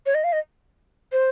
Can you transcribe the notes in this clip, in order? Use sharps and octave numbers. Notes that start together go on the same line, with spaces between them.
C#5
D#5
F5
D#5
C5